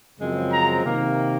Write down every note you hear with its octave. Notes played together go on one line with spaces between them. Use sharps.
F#2 C#3 F3 G#3 C4
A#5
C3 D#3 A#3